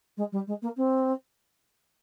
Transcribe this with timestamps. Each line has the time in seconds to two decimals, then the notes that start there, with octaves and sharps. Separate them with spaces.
0.17 G#3
0.32 G3
0.47 G#3
0.62 A#3
0.77 C4